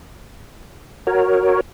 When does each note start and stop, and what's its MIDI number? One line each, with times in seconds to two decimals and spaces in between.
1.07 1.61 66
1.07 1.61 70
1.07 1.61 73